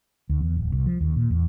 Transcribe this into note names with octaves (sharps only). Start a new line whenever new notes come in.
D2
E2
D1
C2
F3
D#2
A#2
E2